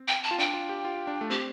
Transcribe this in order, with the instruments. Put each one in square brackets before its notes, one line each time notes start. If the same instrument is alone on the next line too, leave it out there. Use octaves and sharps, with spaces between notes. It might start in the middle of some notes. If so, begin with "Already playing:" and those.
Already playing: [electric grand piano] C4
[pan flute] G5
A5
[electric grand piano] F4
[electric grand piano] D4 [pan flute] G5
[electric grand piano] F4
G4
F4
D4
A3
[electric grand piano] C4 [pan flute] G4